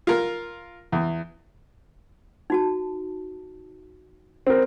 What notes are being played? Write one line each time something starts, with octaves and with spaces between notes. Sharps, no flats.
F4 A#4
E2
D#4 F#4 A5
C4 A#4